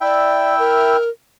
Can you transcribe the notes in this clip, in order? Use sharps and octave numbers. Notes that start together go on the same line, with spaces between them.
E4 D5 E5 G5
A#4